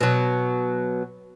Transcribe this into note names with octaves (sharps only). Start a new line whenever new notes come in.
B2 F#3